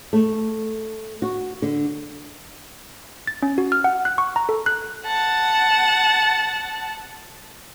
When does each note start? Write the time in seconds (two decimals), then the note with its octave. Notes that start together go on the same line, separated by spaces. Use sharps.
0.13 A3
1.22 F#4
1.62 D3
3.27 A6
3.42 C#4
3.58 F#4
3.72 F6
3.84 F#5
4.05 F#6
4.18 C#6
4.36 A#5
4.49 A4
4.66 F#6
5.05 F#5 A5